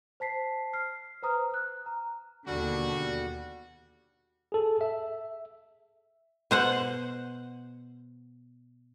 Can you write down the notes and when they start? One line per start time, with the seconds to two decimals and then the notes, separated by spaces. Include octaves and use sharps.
0.20 C5 A5 B6 C7
0.73 F6 C7
1.23 B4 C5 A#5 D#6 F6
1.51 F6 F#6
1.86 A#5
2.46 D#2 B2 D3 G3 F#4
4.52 G#4 A4
4.81 E5
6.51 B2 C5 F#5